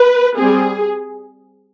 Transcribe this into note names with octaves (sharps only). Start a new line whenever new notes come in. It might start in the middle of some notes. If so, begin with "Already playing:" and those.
Already playing: B4
G3 C4 G#4